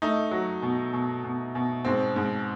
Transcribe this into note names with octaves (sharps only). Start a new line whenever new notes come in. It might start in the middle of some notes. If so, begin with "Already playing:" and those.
A3 D#4
F#3
B2
B2
B2
B2
G#2 C4
G#2